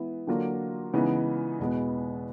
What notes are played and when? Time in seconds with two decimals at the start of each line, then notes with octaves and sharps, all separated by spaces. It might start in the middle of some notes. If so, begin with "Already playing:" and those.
Already playing: E3 G#3 B3 E4
0.27 D3 F#3 A#3 D4 F4
0.94 C#3 E3 G#3 B3 D#4
1.59 E2 B2 G#3 B3